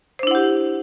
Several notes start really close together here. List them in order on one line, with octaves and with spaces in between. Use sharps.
C5 D4 E4 F#5 G4